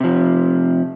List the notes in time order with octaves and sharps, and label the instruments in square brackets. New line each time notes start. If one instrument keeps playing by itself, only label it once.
[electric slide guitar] C3 F3